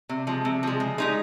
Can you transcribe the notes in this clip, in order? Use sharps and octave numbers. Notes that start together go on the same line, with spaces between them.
C3
F3 G#3
C3
F3 G#3
C#3
G#3 D#4 G4